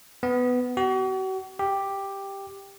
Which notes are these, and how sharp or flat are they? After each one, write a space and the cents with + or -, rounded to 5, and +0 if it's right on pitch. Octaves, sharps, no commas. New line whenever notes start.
B3 +10
F#4 +40
G4 +5